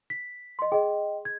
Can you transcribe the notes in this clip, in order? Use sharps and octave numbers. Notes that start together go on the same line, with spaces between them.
B6
D#5 C6
G#4 D#5 G5
G#6